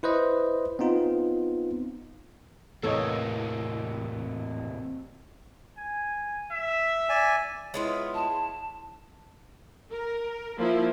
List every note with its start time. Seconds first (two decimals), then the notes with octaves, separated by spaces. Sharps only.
0.03 E4 B4 C5 D#5
0.79 B3 C4 D#4 F4
2.83 E2 A2 C3 E3 A#3 A4 C#5 D#5
5.77 G#5
6.51 E5
7.09 D5 G#5
7.74 G#3 B3 E4 F4 C#5
8.14 A5
9.91 A#4
10.57 F3 A#3 E4